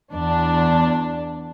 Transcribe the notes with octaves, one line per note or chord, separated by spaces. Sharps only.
E2 D4